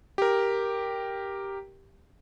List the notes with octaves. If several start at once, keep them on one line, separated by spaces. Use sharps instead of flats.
G4 A#4